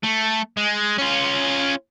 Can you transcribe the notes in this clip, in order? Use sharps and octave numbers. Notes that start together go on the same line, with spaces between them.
A3
G#3
C#4 F4